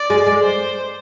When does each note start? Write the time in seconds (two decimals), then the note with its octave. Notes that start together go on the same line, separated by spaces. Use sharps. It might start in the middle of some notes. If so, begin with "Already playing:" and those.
Already playing: D5
0.10 G#3
0.26 G#3
0.43 C5